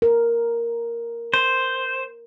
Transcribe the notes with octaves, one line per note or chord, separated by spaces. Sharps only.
A#4
C5